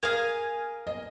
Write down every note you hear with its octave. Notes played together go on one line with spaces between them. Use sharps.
G#4 A#4 F5 G#5
D#5